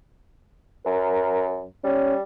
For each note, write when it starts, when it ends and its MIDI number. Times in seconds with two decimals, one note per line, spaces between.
0.86 1.67 42
0.86 1.45 70
1.84 2.22 55
1.84 2.14 61